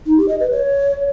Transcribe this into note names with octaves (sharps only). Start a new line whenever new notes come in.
D#4
G4
D#5
B4
C#5